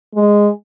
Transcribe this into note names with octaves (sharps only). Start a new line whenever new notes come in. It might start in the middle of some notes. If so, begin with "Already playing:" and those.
G#3